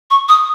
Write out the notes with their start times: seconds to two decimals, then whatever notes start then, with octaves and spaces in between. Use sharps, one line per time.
0.11 C#6
0.29 D#6